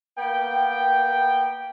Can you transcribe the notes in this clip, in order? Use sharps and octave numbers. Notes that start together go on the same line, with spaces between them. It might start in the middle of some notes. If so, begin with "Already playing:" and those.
A#3 B3 G5